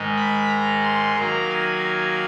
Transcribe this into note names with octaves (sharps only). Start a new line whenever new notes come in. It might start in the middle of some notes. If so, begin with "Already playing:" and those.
Already playing: G#2 D#3 G#3
B5
A#5
C6
D#3 F#3 A#3 A#5
G#5